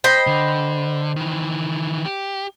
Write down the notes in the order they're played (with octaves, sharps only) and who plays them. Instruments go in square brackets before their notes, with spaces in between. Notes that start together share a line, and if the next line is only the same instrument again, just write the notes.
[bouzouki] C5 [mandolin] D#5 G5 B5
[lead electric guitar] D3
D#3 E3
G4